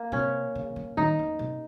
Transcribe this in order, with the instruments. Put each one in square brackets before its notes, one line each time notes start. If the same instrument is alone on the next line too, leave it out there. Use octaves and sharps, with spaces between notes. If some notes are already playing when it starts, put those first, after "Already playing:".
Already playing: [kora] A#3
[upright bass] C3 [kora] C#4
[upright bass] C#3
C#3
[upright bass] D#3 [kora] D#4
[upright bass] F2
C3